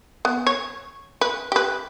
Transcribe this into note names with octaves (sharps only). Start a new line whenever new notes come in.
B3
C#5
B4
G4 B4